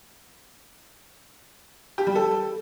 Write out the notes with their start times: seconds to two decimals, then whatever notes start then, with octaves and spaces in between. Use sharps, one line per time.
1.98 G4
2.07 G3
2.15 A4